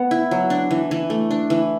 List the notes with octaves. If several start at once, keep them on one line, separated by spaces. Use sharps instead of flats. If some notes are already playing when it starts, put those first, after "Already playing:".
Already playing: B3 F#5
E4
F#3
D4
E3
E3
A3
D4
E3